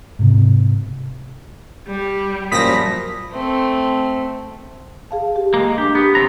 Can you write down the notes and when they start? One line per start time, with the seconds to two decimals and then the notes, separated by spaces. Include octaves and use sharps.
0.19 G#2 C3
1.88 G3
2.52 F#2 A#2 F3 B5 D#6 A#6 B6
3.32 A3 C4
5.11 G#4 F5 A5
5.36 G4
5.54 G#3 A#3
5.78 D4 G4
5.95 B3 G4
6.15 A2 C4 A#5